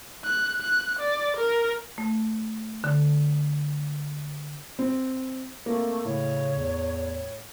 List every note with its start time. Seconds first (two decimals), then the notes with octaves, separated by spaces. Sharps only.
0.25 F#6
0.62 F#6
0.99 D5
1.37 A#4
1.98 A3
2.84 D3
4.79 C4
5.66 A3 A#3 C4
6.05 A2 C#3 C#5
6.57 E2